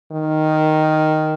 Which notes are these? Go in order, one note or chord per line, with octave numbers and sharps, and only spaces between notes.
D#3